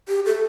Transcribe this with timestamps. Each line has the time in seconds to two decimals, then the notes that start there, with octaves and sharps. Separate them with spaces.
0.08 G4
0.25 A4